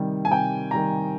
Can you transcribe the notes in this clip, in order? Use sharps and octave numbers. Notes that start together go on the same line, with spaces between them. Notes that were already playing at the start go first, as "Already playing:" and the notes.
Already playing: C3 D#3 G3
G#5
C3 G5
D#3 G3 A#5